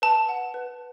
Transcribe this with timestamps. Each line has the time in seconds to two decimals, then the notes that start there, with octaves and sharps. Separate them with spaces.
0.02 B4 A5
0.29 F#5
0.54 B4